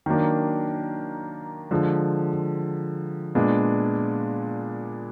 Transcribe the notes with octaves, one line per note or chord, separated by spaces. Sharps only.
D#3 F#3 A#3 D4
D3 F3 G#3
A#2 G#3 B3 D4